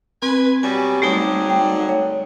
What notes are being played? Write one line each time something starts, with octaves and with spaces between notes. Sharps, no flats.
C4 B4 G#5
B2 F#3 G3 G#5
G#2 D3 F#3 G3 A3 D#4
G5
C#5